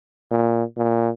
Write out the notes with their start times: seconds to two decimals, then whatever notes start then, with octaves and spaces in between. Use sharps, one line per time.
0.31 A#2
0.77 A#2